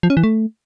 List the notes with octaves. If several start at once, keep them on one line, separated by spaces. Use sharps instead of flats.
F3
C#4
E3
A3